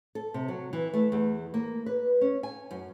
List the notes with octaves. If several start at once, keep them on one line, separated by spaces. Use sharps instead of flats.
A4
C3
F#3
E3
A3
E2
A#3
B4
C#4
G#5
F#2